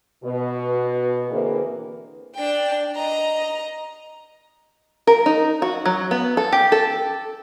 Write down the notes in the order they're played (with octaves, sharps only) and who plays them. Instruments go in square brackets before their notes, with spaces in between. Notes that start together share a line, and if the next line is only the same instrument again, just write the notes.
[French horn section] B2
D3 E3 A#3 C4 G#4 B4
[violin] D4 G5
D#5 A#5
[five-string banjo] A#4
D#4
F#4
F#3
B3
A4
G4
A4